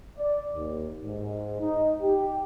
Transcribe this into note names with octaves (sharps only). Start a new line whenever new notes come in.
D5
D#2
G#2
D#4
G4